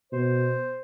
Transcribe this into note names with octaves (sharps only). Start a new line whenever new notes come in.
B2 C5